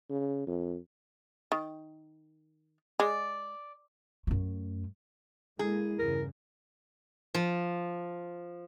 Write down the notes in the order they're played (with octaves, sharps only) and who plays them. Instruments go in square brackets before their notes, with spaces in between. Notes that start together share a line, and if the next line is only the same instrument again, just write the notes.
[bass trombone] C#3
F2
[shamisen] D#3
[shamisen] G#3 [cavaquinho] D5
[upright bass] F#2 A3
[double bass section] G#3 A#3 [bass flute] E4 [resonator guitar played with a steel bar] G#4
[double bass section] E2 G2 C#3 [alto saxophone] A#4
[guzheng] F3